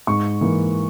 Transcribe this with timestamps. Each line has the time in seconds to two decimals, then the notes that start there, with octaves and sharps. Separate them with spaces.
0.07 G#2 C#6
0.41 E3 A#3